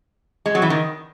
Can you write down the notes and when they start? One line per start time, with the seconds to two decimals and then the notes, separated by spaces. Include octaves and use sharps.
0.46 G#3
0.55 F#3
0.62 E3
0.70 D#3